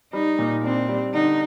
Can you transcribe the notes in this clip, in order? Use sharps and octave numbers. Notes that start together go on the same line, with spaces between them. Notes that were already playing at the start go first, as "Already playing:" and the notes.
G3 D#4
A#2
C4 D4
G3
D3 D#4